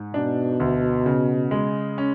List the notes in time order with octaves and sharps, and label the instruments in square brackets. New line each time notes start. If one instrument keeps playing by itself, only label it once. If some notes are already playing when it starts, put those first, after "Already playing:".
Already playing: [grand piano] G#2
[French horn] B2 [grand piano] D4
[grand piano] D2
C#3
G#3
C#4